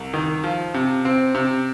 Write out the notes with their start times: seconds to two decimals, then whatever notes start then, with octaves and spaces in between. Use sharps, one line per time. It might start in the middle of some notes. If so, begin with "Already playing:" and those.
Already playing: C2
0.14 D#3
0.44 F3
0.74 C3
1.05 C4
1.35 C3